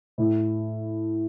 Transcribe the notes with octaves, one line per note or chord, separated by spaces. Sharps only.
A2